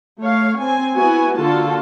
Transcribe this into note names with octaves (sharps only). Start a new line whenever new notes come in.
A3 C#5 F5
C4 G#5
B3 E4 F#4 G#5
D3 A#3 F4 F#4 A4 A5